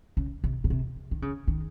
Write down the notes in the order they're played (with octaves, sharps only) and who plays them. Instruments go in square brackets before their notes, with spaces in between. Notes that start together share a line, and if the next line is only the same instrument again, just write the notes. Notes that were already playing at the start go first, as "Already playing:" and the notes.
[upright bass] C#3
C3
C#3
C3
D#3
C#3
D#3